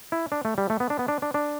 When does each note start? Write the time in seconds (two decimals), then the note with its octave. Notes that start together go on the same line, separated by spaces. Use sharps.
0.12 E4
0.32 D4
0.45 A3
0.58 G3
0.70 A3
0.80 B3
0.90 D4
0.99 B3
1.08 D4
1.22 D4
1.34 D4